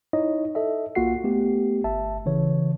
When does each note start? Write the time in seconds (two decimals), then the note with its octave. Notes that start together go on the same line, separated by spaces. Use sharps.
0.13 D#4 E4 C#5 D#5
0.55 A4 D#5 E5
0.95 B1 A#3 F4 F#4 F#5 C7
1.24 A3 B3 G4
1.84 G1 E5 A5
2.26 C#3 E3 C#5